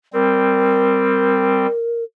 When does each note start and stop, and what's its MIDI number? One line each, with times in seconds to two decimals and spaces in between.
0.13 1.66 55
0.13 1.66 60
0.13 2.03 70